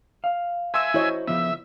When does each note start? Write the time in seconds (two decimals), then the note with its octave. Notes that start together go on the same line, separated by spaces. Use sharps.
0.24 F5
0.74 E5 G#5 C6 E6
0.94 E4 F#4 C5 C#5 D#5
1.28 C#3 F3 B3 E5